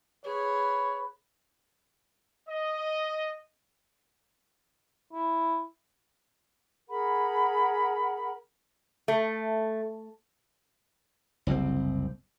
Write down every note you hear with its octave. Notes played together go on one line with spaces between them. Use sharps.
G#4 B4 C#5
D#5
E4
G#4 A#4 F#5 B5
A3
F#1 C2 A#2 C4